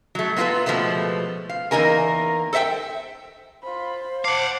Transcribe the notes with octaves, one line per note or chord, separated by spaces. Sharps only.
F#3 A3
A#3 B3 F4 G#4 A4 B4
B2 F3 G#3 A3 B3
F5
E2 A#3 D#4 A#4 G#5
A4 C5 E5 F#5 G5
F4 C5 B5
F5 F#5 A5 D6